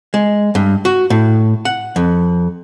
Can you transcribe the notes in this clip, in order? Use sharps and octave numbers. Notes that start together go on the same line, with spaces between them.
G#3
G2
F#4
A2
F#5
F2